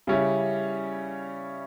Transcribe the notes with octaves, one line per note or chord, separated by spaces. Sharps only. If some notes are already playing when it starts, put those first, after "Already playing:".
C#3 G3 C#4 E4